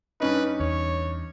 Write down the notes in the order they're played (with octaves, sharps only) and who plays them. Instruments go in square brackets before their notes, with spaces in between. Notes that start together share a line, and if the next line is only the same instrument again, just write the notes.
[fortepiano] G2 C#4 D#4 [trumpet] B4
[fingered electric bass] E2 [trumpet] C#5